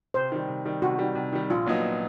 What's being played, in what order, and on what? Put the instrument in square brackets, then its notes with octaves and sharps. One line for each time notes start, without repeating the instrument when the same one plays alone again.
[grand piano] C3 [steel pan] C5
[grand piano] D#3 G3
C3
D#3 G3
[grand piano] C3 [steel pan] F#4
[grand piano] D#3 G3
C3
D#3 G3
[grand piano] A#1 [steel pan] F4
[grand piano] A#2 F#3 B3 D#4